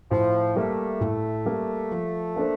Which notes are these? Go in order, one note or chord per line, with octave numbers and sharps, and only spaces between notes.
A2 F3
G3 A3 A#3
A2
G3 A#3
F3
A#3 D4 A4 C5